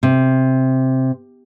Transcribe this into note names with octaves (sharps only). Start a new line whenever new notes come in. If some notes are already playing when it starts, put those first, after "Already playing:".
C3